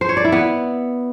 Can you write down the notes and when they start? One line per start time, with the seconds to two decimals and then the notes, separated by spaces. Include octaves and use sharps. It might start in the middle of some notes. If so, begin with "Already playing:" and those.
0.01 C5
0.09 C#5
0.17 D5
0.25 E4
0.32 B3